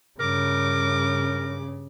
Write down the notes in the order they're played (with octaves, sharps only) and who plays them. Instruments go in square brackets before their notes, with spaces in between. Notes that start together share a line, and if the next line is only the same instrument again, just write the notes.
[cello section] G2 [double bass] C#3 [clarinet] A#4 [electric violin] D6